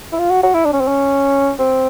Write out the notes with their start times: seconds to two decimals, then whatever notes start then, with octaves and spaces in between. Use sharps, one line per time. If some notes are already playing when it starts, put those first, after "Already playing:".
0.12 E4
0.19 F4
0.30 F#4
0.43 F#4
0.54 E4
0.65 D4
0.73 C#4
0.80 C4
0.87 C#4
1.59 C4